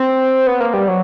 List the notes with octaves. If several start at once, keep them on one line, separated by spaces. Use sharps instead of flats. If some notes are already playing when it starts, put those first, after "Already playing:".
Already playing: C4
B3
A#3
G3
F#3